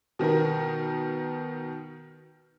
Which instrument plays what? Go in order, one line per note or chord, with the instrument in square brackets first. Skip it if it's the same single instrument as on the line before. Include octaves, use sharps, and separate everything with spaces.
[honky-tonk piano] B2 D#3 B3 A#4